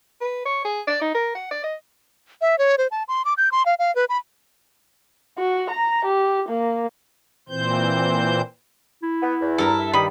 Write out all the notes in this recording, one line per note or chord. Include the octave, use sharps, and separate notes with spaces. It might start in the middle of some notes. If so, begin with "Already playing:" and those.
B4
C#5
G#4
D5
D#4
A#4
F#5
D5
D#5
E5
C#5
C5
A5
C6
D6
G6
C6
F5
F5
B4
B5
F#4
A#5
G4
A#3
A#2 E3 C4 C5 G6
E4
B3
E2
G2 A4 A#4 A#5
E5
G2 D#3 G3 B5 D#6